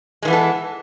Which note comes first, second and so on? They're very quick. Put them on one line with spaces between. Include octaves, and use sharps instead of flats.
G#3 D#3 E3 B3 A4